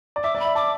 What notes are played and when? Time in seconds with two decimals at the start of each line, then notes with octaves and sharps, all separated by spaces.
0.16 D5
0.24 E5 D6
0.35 D5
0.40 B5
0.45 E5
0.55 A5 D6